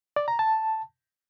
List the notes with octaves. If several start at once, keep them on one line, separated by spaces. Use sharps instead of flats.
D5
A#5
A5